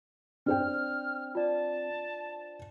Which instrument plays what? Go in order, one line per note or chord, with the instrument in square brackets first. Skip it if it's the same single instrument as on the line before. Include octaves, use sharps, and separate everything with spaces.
[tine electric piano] C4 [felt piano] D4 C5 G5 [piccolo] F6
[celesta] F4 D5 [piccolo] A5